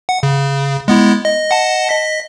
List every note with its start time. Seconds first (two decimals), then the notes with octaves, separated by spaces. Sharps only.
0.09 F#5
0.23 C#3
0.88 G#3 B3 E4
1.25 D#5
1.49 D#5 F#5 A5
1.89 D#5 B6